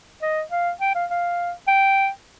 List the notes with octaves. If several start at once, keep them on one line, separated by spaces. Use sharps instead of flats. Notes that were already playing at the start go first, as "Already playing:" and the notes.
D#5
F5
G5
F5
F5
G5